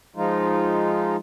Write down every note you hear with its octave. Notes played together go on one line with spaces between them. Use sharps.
F3 G#3 D#4 F4